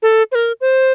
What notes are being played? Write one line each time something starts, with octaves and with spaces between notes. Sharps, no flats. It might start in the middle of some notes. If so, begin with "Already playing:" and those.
A4
C5
A#4
C5